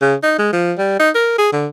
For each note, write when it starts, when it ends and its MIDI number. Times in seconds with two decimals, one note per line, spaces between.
0.02 0.15 49
0.23 0.38 63
0.39 0.50 56
0.53 0.73 53
0.78 0.97 55
0.99 1.10 63
1.15 1.38 70
1.38 1.48 68
1.52 1.67 50